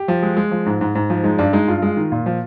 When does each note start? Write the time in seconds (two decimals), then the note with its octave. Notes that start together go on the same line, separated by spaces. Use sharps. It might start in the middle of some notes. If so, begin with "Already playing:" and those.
Already playing: G4
0.08 F3
0.23 G#3
0.37 G#3
0.51 F3
0.66 G#2
0.81 G#2
0.95 G#2
1.10 F3
1.24 G#3 D#4
1.38 G2 D4
1.53 G#3 D#4
1.68 G2 F4
1.82 G#3
1.97 D#3
2.12 A#2
2.26 F3